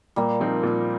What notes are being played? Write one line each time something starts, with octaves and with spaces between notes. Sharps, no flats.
A#2 G3 A#3
F3 C4 D#4 A#4
A#2